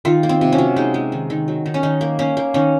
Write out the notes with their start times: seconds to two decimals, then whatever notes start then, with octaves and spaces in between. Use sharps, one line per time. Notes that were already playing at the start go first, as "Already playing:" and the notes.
0.05 D#3 F4
0.23 A#3
0.29 C4
0.41 C3
0.52 C#4
0.58 F#3
0.76 G#3 D#4
0.94 G#3
1.12 D#3
1.30 D#3
1.48 F#3
1.66 D#3
1.74 C#4
1.83 D#3 D#4
2.01 A#3
2.19 A#3 C#4
2.37 A#3
2.54 D#3 C#4